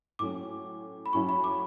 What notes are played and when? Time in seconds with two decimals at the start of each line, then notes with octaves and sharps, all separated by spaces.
0.19 A2 F#3 A3 C#4 D6
1.06 B5
1.13 A2 F#3 C#4 E4 C#6
1.29 B5
1.44 D6